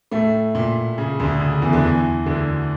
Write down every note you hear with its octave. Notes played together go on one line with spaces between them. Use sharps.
A2 A3
A#2
C#3
D2 D3
C#3
E2 E3
D3
E2 E3
D2 D3